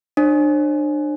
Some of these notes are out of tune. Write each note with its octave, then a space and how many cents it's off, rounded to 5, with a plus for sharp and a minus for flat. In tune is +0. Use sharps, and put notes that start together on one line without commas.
D4 +30 C5 +45